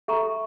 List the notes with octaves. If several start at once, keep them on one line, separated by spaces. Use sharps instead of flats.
A4 E5 A#5 C#6